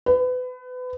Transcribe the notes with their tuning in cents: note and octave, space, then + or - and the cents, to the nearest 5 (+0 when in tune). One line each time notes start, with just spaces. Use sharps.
B4 +30